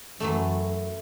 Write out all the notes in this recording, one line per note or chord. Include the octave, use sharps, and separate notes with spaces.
F#2 E3 F#3 A3